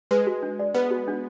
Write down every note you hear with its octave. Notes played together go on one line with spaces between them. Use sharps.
G#3 B4
F#4
D4
D5
B3 B4
F#4
D4